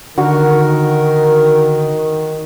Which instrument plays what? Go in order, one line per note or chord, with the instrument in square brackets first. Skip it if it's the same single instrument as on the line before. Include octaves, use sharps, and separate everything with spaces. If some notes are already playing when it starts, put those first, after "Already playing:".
[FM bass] D3 [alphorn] D#3 [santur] F#4 [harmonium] A#4